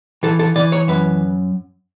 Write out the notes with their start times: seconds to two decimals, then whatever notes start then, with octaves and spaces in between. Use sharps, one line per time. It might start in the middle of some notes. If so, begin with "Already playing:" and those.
0.23 E3 A4
0.39 A4
0.56 E3 D5
0.72 C#5
0.88 F#2 B4